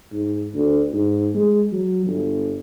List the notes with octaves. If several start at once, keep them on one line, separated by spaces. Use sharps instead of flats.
G#2
D2
G#2
G#3
F#3
G1